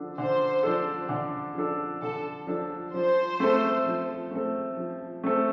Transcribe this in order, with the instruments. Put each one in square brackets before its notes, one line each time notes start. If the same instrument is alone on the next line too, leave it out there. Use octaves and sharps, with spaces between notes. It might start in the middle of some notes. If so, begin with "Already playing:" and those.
Already playing: [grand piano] D3 F3 D4 A4
[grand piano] D3 [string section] C5
[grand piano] F3 D4 A4
D3
F3 D4 A4
[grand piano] D3 [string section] A4
[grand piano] F3 D4 A4
[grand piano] F3 [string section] C5
[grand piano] A3 C4 A4
F3
A3 C4 A4
F3
A3 C4 A4